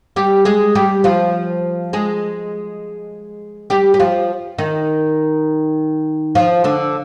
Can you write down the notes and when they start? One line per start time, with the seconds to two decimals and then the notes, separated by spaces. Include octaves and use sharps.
0.16 G3 G4
0.45 G#3 G#4
0.75 G3 G4
1.04 F3 F4
1.93 G#3 G#4
3.70 G3 G4
3.94 G4
3.99 F3 F4
4.58 D#3 D#4
6.35 F3 F4
6.64 D3 D4